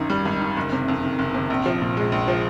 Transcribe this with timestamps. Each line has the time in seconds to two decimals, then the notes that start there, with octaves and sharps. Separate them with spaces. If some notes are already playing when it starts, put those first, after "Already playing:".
Already playing: G#1 F#2 D#3
0.10 G3
0.25 G#1
0.41 D#3
0.57 F#1
0.72 C3
0.88 F2
1.03 D#3
1.19 F#1
1.34 C3
1.50 A#1
1.66 F3
1.82 A#2
1.97 G#3
2.12 A#1
2.28 F3